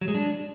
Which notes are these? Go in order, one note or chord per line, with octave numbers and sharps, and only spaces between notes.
F#3
G#3
D4